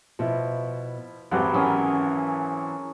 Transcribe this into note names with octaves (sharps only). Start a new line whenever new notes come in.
B2 F3 E4
G#1 F2 F#3 B3 G4 F#5
E3 C#4 G#4 A#4